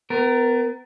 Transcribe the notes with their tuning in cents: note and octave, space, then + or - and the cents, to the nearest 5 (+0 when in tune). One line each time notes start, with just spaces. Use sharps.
B3 +35 A#4 +0